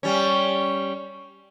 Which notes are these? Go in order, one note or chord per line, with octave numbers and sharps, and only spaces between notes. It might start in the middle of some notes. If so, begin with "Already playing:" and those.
G3 C#4